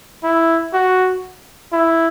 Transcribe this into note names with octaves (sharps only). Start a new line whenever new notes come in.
E4
F#4
E4